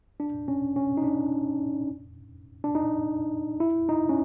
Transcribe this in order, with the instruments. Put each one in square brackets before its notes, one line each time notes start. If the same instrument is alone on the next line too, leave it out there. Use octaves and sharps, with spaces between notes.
[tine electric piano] D4
C#4
C#4
D#4
D4
D4
D#4
E4
D#4
C#4